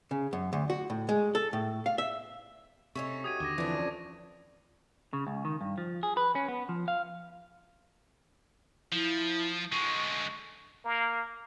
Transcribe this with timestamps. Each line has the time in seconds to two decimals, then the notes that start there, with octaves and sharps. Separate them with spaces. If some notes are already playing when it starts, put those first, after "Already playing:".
0.11 C#3
0.33 F#2
0.53 D2
0.70 F#4
0.90 A2
1.09 G#3
1.35 A4
1.53 A2
1.86 F5
1.98 E5
2.95 C3 A3 C#4 D#4 C#6
3.24 F#4 G4 D#6 G#6 D#7
3.40 D#2 D3 D6 A#6
3.58 E3 F3 A3 C4 D4
3.75 F2 F3 C#4
5.13 C#3
5.27 C#2
5.45 D#3
5.61 G2
5.78 F3
6.03 G#4
6.17 B4
6.35 C#4
6.48 B3
6.69 F3
6.88 F5
8.93 F3 E4
9.72 D3 G#3 C#6
10.85 A#3